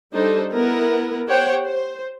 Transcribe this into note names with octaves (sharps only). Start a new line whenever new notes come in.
G3 D4 D#4 A4 C5
B3 E4 A#4
G4 C5 C#5 F#5 G5
C5